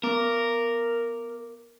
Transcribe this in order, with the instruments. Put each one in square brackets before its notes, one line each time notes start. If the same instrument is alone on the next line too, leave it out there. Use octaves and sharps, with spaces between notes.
[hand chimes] B3 D6 [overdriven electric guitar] A#4